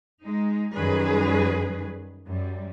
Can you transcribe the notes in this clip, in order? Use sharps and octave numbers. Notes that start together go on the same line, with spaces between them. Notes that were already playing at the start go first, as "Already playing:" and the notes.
G#3 D#4
F#2 D#3 G3 G#4 B4
F#2 G3